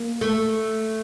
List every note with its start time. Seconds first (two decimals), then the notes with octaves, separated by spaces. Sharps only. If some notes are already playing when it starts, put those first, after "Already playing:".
Already playing: A#3
0.21 A3